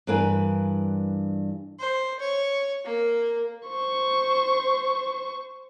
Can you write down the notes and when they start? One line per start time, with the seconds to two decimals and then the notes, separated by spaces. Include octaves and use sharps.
0.07 G2 E3 D4 A#4 B4 G#5
1.79 C5
2.20 C#5
2.85 A#3
3.69 C5 C#6